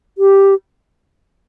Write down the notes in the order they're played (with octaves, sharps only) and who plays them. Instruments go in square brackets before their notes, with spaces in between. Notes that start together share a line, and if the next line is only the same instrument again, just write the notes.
[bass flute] G4